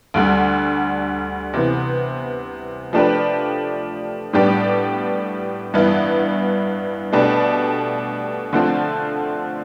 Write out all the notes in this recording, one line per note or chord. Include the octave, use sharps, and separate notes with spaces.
D2 D3 G3
C3 E3 B3
F3 A3 D4 G4 B4
A2 G3 B3 D4 G4
G2 E3 B3 E4
B2 A3 D4 G4 B4
D3 F3 A3 C4